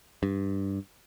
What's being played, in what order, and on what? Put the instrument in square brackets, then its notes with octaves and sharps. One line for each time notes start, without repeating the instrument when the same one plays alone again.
[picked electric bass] G2